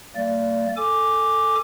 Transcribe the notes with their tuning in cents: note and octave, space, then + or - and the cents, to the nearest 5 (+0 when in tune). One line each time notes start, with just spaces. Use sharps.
G3 -40 A#3 -40 D5 -15
A4 +10 G#5 +5 D6 +0